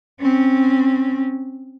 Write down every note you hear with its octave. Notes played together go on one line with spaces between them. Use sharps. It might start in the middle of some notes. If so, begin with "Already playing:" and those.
C4 C#4